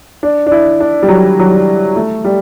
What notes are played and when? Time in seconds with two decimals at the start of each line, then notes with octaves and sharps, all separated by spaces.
0.23 D4
0.47 D4
0.52 E4
0.80 D4
1.03 G3
1.08 F#3
1.39 F#3
1.52 G3
1.96 A3
2.25 G3